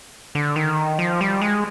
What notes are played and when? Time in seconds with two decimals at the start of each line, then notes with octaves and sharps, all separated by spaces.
0.35 D3
0.56 D#3
0.99 F3
1.21 G3
1.41 G#3